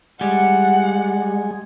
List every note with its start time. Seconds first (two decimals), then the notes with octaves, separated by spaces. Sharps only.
0.21 G3 G#3 F#5